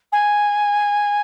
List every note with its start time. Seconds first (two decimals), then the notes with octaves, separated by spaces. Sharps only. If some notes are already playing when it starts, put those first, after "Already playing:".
0.12 G#5